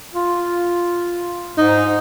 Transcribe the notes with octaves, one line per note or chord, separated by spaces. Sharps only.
F4
G#2 D#4